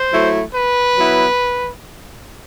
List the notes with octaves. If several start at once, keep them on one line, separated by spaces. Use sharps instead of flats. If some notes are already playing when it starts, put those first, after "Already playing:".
Already playing: C5
F#3 A3 E4
B4
F#3 B3 E4